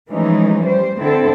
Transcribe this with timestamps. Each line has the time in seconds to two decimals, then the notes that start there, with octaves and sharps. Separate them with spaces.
0.10 E3 F3 G#3 A3 C#4 D#4
0.63 G3 C5
0.98 D3 C4 E4 A4